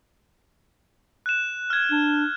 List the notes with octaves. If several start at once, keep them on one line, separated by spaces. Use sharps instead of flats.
F#6 E7
F6 G#6
D4